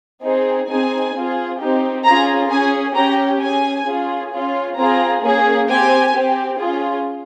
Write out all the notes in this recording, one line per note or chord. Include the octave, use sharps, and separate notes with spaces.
C4 D#4 G#4
C4 D#4 G#4 G#5
C4 F4 G#4
C4 D#4 G4
C#4 F4 G#4 A#5
C#4 G#4 G#5
C#4 G4 A#5
C#4 G#4 G#5
C#4 F4 G#4
C#4 F4 G#4
C4 F4 G#4 A#5
A#3 C#4 G#4
C4 G4 G#5
C4 G4
C#4 F4 G#4